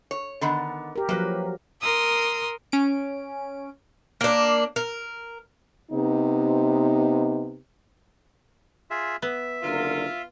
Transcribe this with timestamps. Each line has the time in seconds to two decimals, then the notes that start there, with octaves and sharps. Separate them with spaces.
0.11 C#5
0.41 D3 D#3 B3
0.96 G4 A#4
1.09 F3 F#3 A#3 B4
1.80 A#4 C6 D#6 E6
2.72 C#4 D7
4.21 A#3 D4
4.76 A#4
5.92 C3 B3 D#4
8.90 F4 G#4 E5
9.22 B3 E5
9.62 F#1 D3 F4 A#4